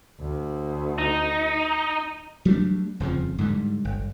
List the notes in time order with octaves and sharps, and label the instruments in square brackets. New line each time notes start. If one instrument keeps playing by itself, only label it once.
[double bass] D2
[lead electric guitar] D#4
[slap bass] F#3 G3 A3 D4
D#1 F2 C#3 F3
G#2 D3 G3
G1